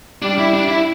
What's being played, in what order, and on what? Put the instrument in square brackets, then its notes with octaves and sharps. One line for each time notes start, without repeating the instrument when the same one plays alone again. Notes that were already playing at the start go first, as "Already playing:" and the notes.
[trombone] G3 [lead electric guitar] D4
[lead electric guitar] E4
D4
E4